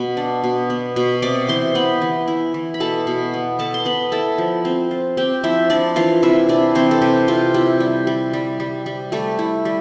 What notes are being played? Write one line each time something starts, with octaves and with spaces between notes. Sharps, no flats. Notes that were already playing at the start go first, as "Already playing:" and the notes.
Already playing: B2 B3
D4
B2
B3
B2
C3 D5 D6
E3 C5 C6
B3 B4 B5
E3
E4
E3
B5
B2 A4 A5
B2
B3
B3 A4 A5
C6
B3 B4 B5
E4 A4 A5
F3
C4
F4
C4 G4 G5
F3 E4 E5
F3 D4 D5
E3 F4 F5
C3 E4 E5
C3 D4 D5
E3 C4 C5
A4
C3 G4
C3 F4
E4 G4
G3
G3
G3
G3
G3
G3 A3 A4
E4
G3